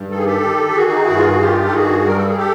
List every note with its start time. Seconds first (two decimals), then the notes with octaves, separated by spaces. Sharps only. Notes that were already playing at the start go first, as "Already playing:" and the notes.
Already playing: G2
0.10 D#3 A4
0.17 G#4
0.25 G4 A4
0.43 D#3
0.68 G4
0.75 D#3 F#4 G#4
0.90 D#4
1.03 E4
1.09 G2
1.16 F4
1.28 F#4
1.40 D#3 F4 G4
1.66 A4
1.73 G2 F#4 G#4
2.06 G3 A#4
2.17 A4
2.27 G#4
2.37 G4 A4